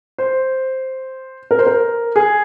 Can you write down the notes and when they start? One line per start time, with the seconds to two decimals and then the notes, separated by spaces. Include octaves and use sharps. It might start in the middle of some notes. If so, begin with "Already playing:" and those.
0.18 C5
1.51 A#4
1.59 C5
1.67 A#4
2.16 G#4